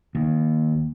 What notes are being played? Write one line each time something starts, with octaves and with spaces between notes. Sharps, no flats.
D#2